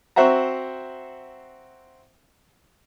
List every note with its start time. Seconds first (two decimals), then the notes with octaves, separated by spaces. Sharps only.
0.16 C4 F#4 C5 E5 F#5 A#5